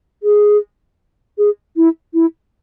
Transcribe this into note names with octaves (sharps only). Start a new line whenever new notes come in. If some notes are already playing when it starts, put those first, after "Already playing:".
G#4
G#4
E4
E4